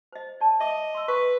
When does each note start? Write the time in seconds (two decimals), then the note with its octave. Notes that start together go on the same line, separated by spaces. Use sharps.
0.12 C5 D#5
0.41 D5 A5
0.60 D#5 E5 D6 D#6
0.95 C6 E6
1.08 A#4 B4 C#6